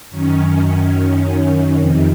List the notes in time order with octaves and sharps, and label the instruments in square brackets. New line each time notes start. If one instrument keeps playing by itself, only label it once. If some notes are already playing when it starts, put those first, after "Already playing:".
[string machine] F#2 D#3 C#4
C#4
F2 C3 D#3